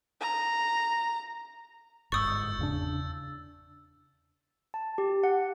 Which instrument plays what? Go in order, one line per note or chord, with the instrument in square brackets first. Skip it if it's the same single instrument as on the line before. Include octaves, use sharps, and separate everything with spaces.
[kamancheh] A#5
[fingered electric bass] G1 G#2 [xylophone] C#6 D#6 [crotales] E6 G6 A6
[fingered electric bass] E2 C#3 D4
[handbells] A5
G4
F#5